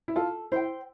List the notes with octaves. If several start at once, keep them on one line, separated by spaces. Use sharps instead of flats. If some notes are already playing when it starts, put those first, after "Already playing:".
E4
F4 A4
E4 C5 G5